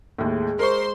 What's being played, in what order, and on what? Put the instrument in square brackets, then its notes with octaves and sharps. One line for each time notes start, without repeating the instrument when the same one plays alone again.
[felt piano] D#2 A2 [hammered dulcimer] G#3
[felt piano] A#4 C#6 [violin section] C5 C6 [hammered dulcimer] D#5